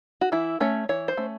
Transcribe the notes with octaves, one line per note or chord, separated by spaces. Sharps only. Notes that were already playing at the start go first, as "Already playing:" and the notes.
F#4
E3 E4
A3 C#4 C#5
E3 C#5
C5
A3 C#4